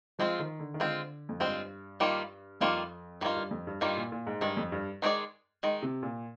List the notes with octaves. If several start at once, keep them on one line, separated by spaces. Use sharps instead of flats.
F3 G#3 C4 F4
D#3
D3
D#3
D3 G#3 C4 F4
F2
G2 G#3 C4 F4
D#3 G3 A#3 F4
F2 D#3 G3 A#3 F4
G2 D#3 G3 A#3 F4
G2
F2
G2
G2 D#3 G3 A#3 F4
A#2
A#2
G#2
G2 D#3 G#3
F2
G2
D#3 G#3 D#4 G#4 D5
D#3 G#3
C3
A#2